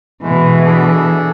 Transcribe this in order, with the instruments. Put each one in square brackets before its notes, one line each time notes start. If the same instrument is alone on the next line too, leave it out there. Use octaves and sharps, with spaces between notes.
[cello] B2 E3 [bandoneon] G#3 A3
[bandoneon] D4 G#4 A4